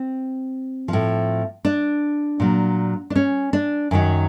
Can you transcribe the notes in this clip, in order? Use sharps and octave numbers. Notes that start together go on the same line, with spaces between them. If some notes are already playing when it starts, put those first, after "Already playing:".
Already playing: C4
A2 F3
D4
A#2 F#3
D4
C#4
D4
F#2 D#3 F#3